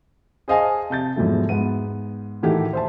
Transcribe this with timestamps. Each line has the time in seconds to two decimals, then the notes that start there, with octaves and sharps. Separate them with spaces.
0.48 G#4 C5 D#5 F5 G#5 A5
0.90 C3 A5 G6 A6
1.16 E2 G#2 B2 F3 F#3 A3
1.49 G#2 B3 D#7
2.43 A2 D#3 E3 F#4 G4 A4
2.73 C5 E5 A5